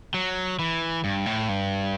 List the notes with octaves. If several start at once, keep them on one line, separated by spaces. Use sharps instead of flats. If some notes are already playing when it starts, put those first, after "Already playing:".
F#3
E3
G2
A2
G2